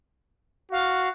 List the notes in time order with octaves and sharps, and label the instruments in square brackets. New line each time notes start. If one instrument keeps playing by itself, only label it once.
[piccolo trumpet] F#4 [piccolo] F5